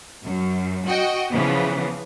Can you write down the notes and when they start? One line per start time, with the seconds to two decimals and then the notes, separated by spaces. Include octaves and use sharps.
0.23 F#2
0.86 F#4 D#5 G5
1.32 C#3 E3 F3 B3